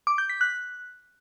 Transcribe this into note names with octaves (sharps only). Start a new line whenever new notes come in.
D6
G6
B6
F#6